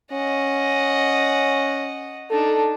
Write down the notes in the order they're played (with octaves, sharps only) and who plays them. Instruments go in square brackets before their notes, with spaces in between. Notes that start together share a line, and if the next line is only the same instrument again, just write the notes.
[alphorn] C#4 [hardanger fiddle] D#5 F#5
[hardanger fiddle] D4 D#4 [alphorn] A4